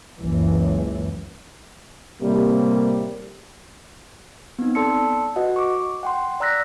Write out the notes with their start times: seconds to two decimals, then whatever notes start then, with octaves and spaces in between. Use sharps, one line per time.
0.18 F#1 C#2 E3
2.21 A2 C3 G3 A#3
4.59 B3 C4 D#4
4.75 A4 D5 A5 C6 E6 C#7
5.36 F#4 B4 D#5 F#5
5.56 C#6 D6
6.03 F#5 G5 C6
6.40 D5 A#5 E6 F#6 A#6 B6